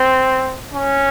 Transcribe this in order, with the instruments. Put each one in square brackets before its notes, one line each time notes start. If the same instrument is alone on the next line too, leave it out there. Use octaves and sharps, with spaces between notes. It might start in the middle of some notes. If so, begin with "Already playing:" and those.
Already playing: [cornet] C4
C#4